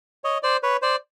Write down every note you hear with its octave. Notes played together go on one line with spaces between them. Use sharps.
C#5 D#5
C5 D5
B4 C#5
C5 D5